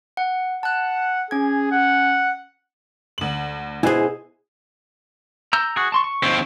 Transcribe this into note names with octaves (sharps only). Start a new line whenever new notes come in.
F#5
F#5 A5 F#6
C#4 G#4 G#6
F#5
D2 F#7
B2 E4 G#4 C5 G#5
A#5 E6 G6
F#4 G#4
A5 C6 C#6
C#6
D#2 C4